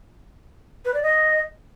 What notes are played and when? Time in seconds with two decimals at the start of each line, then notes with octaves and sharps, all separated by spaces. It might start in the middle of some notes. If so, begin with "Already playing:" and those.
0.85 B4
0.94 D5
1.03 D#5